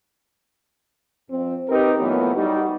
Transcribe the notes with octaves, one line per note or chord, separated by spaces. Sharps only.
F2 C4
C4 D#4 G4 A#4 B4
A#2 E3 F#3 A3 B3
G3 D#4 F#4